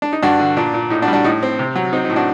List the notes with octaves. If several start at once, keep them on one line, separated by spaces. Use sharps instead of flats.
D4
D#4
G2 D4 F#4
D3
A#2 D4
A#2
A2 D#4
D4 F#4
G3
D4 F#4
A2 D#4
C4
C3
F#3
C4 D#4
D#4
A2
D4 F#4